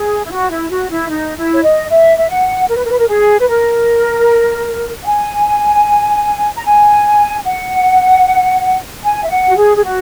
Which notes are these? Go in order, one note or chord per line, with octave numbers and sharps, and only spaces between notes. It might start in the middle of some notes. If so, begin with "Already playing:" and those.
Already playing: G#4
E4
F#4
E4
F#4
E4
D#4
E4
C#5
D#5
E5
E5
F#5
A#4
B4
A#4
B4
A#4
G#4
B4
A#4
F#5
G#5
A#5
G#5
F#5
G#5
E5
F#5
F#4
G#4
G#4
F#4